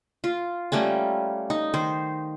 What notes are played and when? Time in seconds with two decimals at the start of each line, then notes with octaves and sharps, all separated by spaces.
0.24 F4
0.72 G3 A3 A#3 C#4
1.50 D#4
1.74 D#3 C5